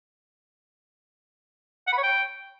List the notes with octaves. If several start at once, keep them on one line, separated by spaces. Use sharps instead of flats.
F#5
B5
C#5
G5